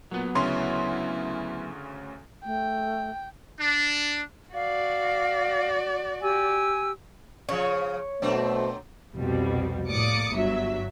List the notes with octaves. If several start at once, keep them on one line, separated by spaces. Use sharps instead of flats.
A#2 F#3 B3
D2 C#3 C#4 E4 C6
A3 G5
D4
F#4 D5 F5
G4 G#5 E6
C#3 F3 C#5
B2 F#3 A3 C4 D4 C5
C2 F2 B2 G3
A2 A#3 D5 D6 D#6 C#7
G1 G2 F#3 E5